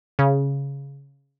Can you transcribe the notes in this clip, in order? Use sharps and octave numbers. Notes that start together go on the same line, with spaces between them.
C#3